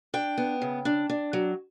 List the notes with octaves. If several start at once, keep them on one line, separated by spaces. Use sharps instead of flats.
D4 G5
B3
C#3
D4
D4
F#3